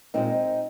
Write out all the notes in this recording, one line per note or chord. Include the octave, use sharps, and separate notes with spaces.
A#2 F3 G#3 C4 D#4